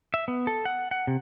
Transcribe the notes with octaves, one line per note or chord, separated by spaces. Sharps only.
E5
B3
A4
F#5
F#5
C3